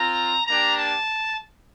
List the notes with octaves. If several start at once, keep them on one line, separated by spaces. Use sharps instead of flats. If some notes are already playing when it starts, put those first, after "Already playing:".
Already playing: C4 F4 A#5
A#3 D4 G4 A#5
A5